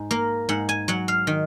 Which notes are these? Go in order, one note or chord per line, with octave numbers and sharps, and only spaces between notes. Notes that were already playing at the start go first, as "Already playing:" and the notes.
Already playing: G#2
A#3
G#2 F#5
G#5
F#3 F#5
F5
D#3